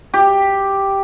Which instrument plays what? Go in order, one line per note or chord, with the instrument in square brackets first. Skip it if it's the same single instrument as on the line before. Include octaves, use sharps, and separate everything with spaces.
[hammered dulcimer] G4